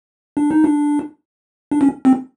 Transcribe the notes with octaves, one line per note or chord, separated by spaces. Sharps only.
D4
D#4
D4
D4
C#4
C4